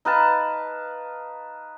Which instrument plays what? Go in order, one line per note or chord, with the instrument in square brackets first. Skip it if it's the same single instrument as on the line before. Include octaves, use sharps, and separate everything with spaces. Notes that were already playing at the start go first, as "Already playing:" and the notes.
[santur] D#4 B4 F5 A5